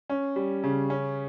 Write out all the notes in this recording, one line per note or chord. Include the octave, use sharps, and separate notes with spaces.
C#4
G3
C#3
C#4